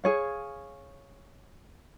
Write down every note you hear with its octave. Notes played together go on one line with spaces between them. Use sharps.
G#4 C#5 F5